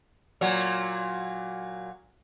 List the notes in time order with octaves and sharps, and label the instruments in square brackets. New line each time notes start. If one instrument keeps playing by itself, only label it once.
[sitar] A#2 F#3